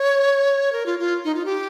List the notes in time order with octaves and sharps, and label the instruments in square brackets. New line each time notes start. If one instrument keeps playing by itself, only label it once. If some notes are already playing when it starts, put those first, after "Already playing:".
Already playing: [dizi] C#5
A#4
F4
F4
D#4
F4
G4